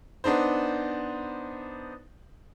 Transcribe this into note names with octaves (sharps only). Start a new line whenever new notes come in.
B3 D4 D#4 C5